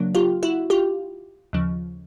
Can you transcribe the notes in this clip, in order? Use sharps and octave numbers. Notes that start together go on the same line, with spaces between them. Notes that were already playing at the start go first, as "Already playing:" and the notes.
Already playing: C#3 F#3 A#3 D4
F4 G4
E4 F#4
F4 G4
D#2 C#3 F3